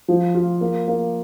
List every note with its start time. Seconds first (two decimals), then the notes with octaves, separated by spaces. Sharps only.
0.08 F3
0.35 F4
0.61 A#3
0.88 A#3